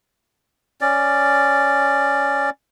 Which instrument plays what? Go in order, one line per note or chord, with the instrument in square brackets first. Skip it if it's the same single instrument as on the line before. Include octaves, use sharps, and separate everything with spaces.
[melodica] C#4 D5